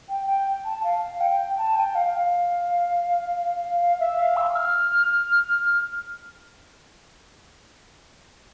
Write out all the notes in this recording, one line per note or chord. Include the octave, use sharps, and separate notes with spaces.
G5
G5
A5
F5
G5
A5
G5
F5
F5
F5
E5
F5
E6
F6